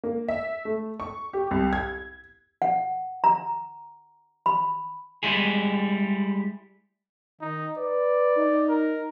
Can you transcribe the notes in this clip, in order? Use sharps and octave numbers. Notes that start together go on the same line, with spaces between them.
A#3
E5
A3
C#6
G4
C2
G#6
F#5
A#5
B5
G3 G#3 E4 G#4
D#3 D#4
B4 D5
D#4
A#4